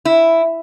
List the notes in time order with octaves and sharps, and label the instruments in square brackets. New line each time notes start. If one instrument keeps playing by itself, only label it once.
[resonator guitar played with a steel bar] E4